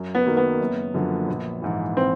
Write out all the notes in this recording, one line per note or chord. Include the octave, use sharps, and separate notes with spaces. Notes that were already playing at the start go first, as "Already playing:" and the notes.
Already playing: F#2
B3
D#3 F#3 A#3
B3
F#1
F#2 D3 F3
A#1
G#2 E3
C4